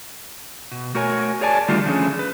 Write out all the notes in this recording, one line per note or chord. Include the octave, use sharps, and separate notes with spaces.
B2
A3 F#4 A#4 C#5 G#5
G#4 C#5 D5 G#5 A5
D3 D#3 G3 A3 F4
D3 F3 A3 A#3 C#4 G#4
B4